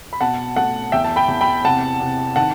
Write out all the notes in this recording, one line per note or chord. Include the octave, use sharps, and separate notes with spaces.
B5
B2 F#5 A5
A3 F#5 A5
E2 E5 G5
A5
G5 B5
E2
G5 B5
C3 F#5 A5
C3
D#3 F#5 A5